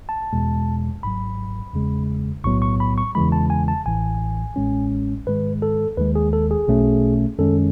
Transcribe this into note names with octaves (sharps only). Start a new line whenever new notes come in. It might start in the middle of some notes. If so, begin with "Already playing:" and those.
A5
E2 B2 G#3
G#1 G#2 F#3 B5
E2 C#3 G#3
B1 A2 F#3 B3 C#6
C#6
B5
C#6
E2 C#3 E3 G#3 B5
A5
G#5
A5
A1 A2 E3 G#5
A1 A2 G#3 C#4
G#2 D#3 G#3 B4
A4
D#2 D#3 G#3 B4
G#4
A4
G#4
B1 B2 A3 C#4
F#2 D#3 G#3 C#4 A4